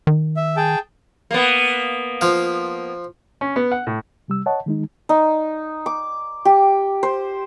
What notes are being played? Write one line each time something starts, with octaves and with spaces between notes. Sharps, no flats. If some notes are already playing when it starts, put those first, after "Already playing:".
D#3
E5
G#4 G5 A5
A#3 B3
F3 F5
C#4
B3
F#5
A2
C3 G3 E6
C#5 D#5 F#5 A5
D#3 G#3 D#4
D#4
D6
G4
C5